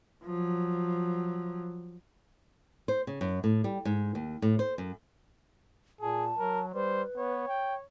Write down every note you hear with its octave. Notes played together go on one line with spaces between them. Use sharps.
F3 F#3
C5
C#3
F#2
A2
G3
G#2
D#2
A2
C5
F#2
A#2 G#4 A5
F#3 A#4
G3 B4 C5
B3 C#5
G5